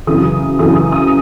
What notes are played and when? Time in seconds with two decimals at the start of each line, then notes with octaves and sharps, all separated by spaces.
0.07 F#2 C#3 E3 D#6
0.59 F#2 C#3 E3 D#6
0.76 D#6
0.92 D#6